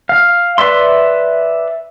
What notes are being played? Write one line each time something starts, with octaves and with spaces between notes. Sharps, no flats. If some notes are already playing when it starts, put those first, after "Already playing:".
F5
B4 D5 E5 C6